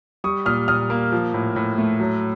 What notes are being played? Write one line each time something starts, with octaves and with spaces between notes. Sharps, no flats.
G3 C#6 D#6
A#2 D#6 F6
A#2 D#6 F6
A#3
F3
A2
A2
A3
F#3